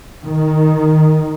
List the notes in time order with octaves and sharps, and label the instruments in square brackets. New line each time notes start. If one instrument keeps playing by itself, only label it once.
[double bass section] D#3